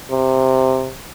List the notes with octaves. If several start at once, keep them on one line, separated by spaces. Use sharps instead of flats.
C3